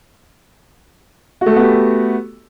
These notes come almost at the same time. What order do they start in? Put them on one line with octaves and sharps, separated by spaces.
F#4 A3 A4 B3 G4